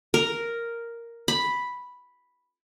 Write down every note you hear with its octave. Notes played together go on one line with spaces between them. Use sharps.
A#4
B5